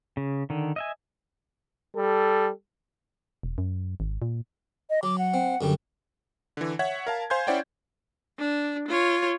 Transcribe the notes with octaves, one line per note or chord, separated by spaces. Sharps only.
C#3
D3 D#3
D#5 E5 G#5
G3 A4
E1
F#2
G#1
A#2
D#5
F#3 D6
F#5
C4
F#2 D3 G3
D3 E3
C#5 E5 F#5 G#6 B6
A#4 F5 A5
C5 F5 G#5 C6 G6 G#6
C#4 E4 C5 D5 F#5 G5
D4
F4 C#5